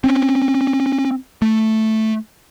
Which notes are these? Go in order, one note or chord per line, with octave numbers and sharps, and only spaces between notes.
C4 C#4
A3